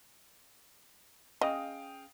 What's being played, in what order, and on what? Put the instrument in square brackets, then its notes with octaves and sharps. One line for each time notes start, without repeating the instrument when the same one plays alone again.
[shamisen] C#3 [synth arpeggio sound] D#5 [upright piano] F5 G5 D#6